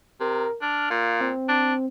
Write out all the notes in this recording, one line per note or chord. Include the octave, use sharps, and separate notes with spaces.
C3 A#4
D4 F6
A#2 F5
C4
D4